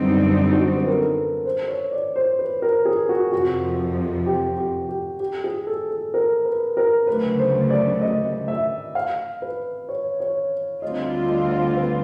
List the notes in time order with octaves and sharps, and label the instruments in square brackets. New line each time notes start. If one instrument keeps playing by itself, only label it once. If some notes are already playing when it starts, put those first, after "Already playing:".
Already playing: [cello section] F#2 D3 G3 C4 D#4 [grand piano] B3 D4
[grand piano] F#4
C5
B4
A#4
A4
C5
C#5
D5
C5
B4
A#4
G#4
F#4
[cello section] F2 C3 F3 [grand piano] F#4
[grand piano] G4
G4
G4
G4
G#4
A4
A4
A#4
B4
A#4
[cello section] D2 C#3 F#3 A3 [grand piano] B4
[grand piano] C5
D5
D#5
E5
F5
B4
C#5
C#5
[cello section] D2 D3 G3 C4 F4 [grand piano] D#5
[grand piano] D#5
B4